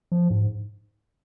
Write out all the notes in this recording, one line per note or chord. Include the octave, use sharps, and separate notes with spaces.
F3
G#2